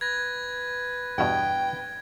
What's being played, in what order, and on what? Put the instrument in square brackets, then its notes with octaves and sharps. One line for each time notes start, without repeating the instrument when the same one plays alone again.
[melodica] B4 [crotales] G#6 A#6
[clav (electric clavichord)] E2 G2 B2 [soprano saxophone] G5 [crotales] G#6